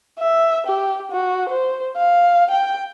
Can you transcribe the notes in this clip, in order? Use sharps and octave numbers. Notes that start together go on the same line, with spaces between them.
E5
G4
F#4
C5
F5
G5